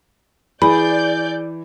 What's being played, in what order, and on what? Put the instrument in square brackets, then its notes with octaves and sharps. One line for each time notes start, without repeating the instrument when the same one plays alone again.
[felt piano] E3 [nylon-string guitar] G#4 [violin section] D5 G6 [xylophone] B5